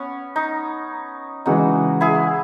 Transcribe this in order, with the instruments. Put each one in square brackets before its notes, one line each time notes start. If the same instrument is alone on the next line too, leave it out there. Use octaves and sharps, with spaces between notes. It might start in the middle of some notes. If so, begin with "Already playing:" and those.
Already playing: [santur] B3 C#4
D#4
[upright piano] C#3 E3 G#3 [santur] D#4 F#4
[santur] E4 G#4